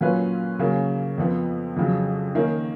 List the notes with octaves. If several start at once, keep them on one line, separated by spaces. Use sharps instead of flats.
A#2 F#3 C#4 F4 B4
C#3 F#3 A#3 C#4
F2 F3 B3
F2 C#3 F#3
D#3 A#3 C#4